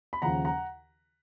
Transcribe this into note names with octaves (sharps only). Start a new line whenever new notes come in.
B5
D#2 C#3 F3 F#5 A#5
F#5 A#5